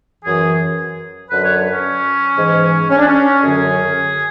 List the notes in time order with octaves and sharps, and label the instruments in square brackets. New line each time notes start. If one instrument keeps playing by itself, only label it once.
[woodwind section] F#2 E3 G#4
F#2 D3 F#3 B4
C#5
B4
C#4
G#2 E3
C#4
D4
C#4
F#2 D3 F#3 G#4